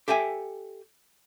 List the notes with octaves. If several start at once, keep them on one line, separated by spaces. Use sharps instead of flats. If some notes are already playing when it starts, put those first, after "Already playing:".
G4 A4 E5 G5 G#5